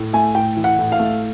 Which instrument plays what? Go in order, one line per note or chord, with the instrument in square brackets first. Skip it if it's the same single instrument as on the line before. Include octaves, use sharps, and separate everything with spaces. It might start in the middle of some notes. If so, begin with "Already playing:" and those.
Already playing: [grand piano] A2
A3 G#5
A2 G5
E3
F#5
A2
F5
A3